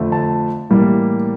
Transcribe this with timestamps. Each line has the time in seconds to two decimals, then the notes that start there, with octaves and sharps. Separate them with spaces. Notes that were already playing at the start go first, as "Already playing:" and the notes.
Already playing: F2 D3 A3
0.12 A5
0.70 A2 E3 G3 A#3